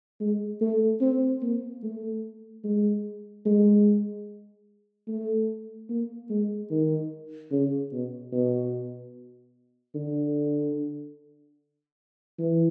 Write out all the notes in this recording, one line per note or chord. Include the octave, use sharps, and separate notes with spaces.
G#3
A3
C4
A#3
A3
G#3
G#3
A3
A#3
G#3
D#3
C#3
B2
B2
D3
E3